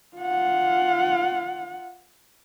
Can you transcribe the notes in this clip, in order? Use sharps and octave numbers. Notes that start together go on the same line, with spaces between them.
F4 F#5